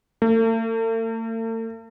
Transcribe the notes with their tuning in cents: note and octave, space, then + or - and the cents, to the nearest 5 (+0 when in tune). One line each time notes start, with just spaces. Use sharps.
A3 +45